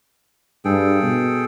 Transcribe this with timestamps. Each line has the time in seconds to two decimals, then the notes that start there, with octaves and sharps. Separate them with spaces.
0.65 G2 G#4 A4 G5
1.03 B2